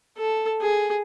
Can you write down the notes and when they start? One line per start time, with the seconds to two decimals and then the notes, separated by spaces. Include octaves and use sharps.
0.19 A4
0.61 G#4